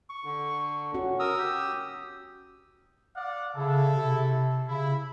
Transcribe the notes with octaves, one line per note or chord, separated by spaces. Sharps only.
C#6
D3
C#4 F#4
A#4 D#6 E6
G4
D5 F5 F#5
C#3 E4 A4
C3
C#3 E4